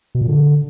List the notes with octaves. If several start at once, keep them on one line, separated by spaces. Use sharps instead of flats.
B2
A#2
D3